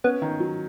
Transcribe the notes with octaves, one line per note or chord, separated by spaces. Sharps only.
B3 C#4
D#3
F#3